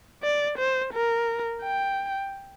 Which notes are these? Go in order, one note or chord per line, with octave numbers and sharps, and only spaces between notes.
D5
C5
A#4
G5